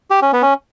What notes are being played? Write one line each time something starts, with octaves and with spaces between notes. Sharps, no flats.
G4
C#4
B3
C#4